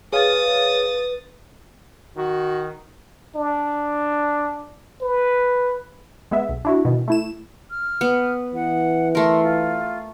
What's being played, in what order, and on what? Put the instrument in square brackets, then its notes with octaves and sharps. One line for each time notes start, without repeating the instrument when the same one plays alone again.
[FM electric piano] G#4 C#5 F5 [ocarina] B4 [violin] D#6 A6
[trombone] D#3 [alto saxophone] F#4
[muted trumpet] D4
B4
[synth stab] G#3 B3 E5
B1
D4 E4 F#4
B2 D#3 E3
A3 E4 E7
[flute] F6
[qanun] B3
[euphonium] E3 [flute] F#5
[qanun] A3 A#4 [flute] C6
[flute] F4